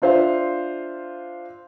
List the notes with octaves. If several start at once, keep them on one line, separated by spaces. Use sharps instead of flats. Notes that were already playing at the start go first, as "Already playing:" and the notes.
D4 F4 C5 E5 F5